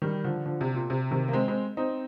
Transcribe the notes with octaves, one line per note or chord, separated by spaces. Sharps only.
D#3 G3
D3 F3
D3 F3
C3
A#2
C3
C3 D#3
A#3
G#3 C4
G#3 C4
C4 D#4